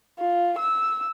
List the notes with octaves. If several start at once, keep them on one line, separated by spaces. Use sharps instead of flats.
F4
E6